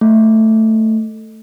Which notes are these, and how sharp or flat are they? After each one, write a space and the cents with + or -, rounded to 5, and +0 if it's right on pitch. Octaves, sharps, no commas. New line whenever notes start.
A3 +5